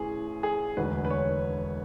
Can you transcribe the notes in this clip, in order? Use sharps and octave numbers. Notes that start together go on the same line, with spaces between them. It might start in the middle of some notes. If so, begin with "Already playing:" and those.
Already playing: A1 E3 G#4
G#4
E1 D2 D3 B4
B4
C#5